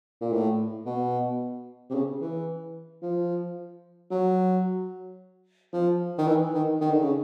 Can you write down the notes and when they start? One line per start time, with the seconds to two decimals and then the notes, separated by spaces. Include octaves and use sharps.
0.22 A#2
0.33 A2
0.86 B2
1.90 C3
1.95 C#3
2.21 E3
3.02 F3
4.11 F#3
5.73 F3
6.18 D#3
6.27 E3
6.54 D#3
6.81 D#3
6.92 D3
7.02 C#3